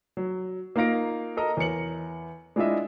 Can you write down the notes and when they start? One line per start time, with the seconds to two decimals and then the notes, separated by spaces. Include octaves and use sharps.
0.17 F#3
0.76 A#3 D#4 F4 F5 A#6 D7
1.37 A4 A#4 D#5 A#5
1.57 E2 A#4 C#5 C#7 F#7
2.56 G#3 D4 E4 F4 D#5 E5